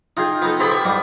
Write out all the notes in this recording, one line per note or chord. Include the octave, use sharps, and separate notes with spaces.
D#4 F4 G#4 G5
B3 D#4 A4
B3 C4 G4 A4 B5
C#6
G#2 G3